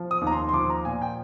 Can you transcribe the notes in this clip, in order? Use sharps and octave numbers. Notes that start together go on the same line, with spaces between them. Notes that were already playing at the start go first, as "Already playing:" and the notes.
Already playing: F3
D#6
D#2
A#5
C6
C6
F3 D6
A#5
A#2 G#5
G5